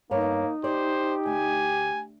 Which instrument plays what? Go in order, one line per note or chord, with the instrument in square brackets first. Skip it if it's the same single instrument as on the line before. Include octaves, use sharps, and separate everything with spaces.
[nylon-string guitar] G2 B3 C#5 [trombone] A#3 [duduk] D#4
[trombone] G4 [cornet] C5 [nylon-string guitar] D5
[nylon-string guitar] D2 [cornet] G#5